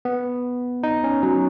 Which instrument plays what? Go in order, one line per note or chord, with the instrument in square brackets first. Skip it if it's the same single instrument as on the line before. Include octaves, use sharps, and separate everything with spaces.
[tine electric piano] B3
D#4
C#4
F#3